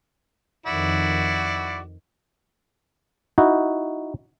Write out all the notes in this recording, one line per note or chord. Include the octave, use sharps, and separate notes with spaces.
F2 D#3 E4 F#4 D5
D#4 E4 F#4